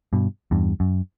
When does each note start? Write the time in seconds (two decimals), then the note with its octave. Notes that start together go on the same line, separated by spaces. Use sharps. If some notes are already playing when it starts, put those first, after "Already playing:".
0.13 G2 B2
0.51 E2 G2
0.80 F#2